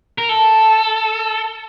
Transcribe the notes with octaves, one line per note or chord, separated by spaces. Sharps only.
A#4
A4